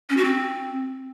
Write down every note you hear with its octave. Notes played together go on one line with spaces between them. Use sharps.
C#4
F#4
C4